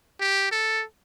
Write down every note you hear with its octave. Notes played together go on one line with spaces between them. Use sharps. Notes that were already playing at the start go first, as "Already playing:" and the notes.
G4
A4